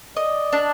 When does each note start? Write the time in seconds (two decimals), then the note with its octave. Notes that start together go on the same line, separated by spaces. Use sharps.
0.16 D5 D#5
0.53 D4